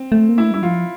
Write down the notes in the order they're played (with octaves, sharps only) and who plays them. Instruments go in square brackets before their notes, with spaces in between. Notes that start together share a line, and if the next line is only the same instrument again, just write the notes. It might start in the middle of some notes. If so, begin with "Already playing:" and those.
Already playing: [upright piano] C4
[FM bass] A3
A#3
[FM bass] A3 [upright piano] E4
[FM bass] G3 [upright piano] E4
[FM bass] F3 [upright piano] F4